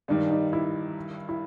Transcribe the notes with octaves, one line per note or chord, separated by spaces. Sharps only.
G2 D#3 G3 D4
D#4
E4
E4